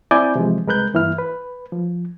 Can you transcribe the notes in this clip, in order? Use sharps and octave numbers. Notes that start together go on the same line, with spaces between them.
C4 E4 D5 G#5 D6 G6
C3 E3 F3 G#3
C2 G#3 A#4 B4 F#6 G6
G2 E3 A#3 E4 F6
B4
F3